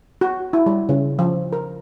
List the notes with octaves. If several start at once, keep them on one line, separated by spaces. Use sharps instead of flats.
F#4
E4
G3
C#3
F3
A#4